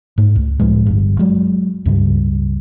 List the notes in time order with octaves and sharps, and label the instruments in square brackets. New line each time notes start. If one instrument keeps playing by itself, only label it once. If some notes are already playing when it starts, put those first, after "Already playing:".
[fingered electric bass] G#2 A3
C#2
C#2 A2 F3 G#3
G1 G2
F#3 G#3
C#2 G2 C#3 G3